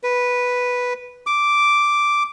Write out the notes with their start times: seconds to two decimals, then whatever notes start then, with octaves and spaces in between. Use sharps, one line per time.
0.03 B4
1.26 D6